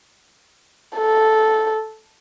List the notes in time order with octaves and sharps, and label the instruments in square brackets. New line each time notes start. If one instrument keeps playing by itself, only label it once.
[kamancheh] A4